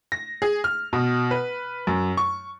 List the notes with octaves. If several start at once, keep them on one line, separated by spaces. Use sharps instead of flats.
A#6
G#4
F6
B2
B4
F#2
C#6